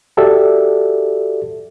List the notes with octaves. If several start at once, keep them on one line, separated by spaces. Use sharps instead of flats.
F#4 G4 A4 D5 E5